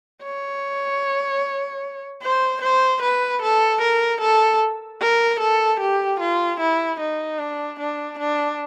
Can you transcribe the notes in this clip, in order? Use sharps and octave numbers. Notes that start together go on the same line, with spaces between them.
C#5
C5
C5
B4
A4
A#4
A4
A#4
A4
G4
F4
E4
D#4
D4
D4
D4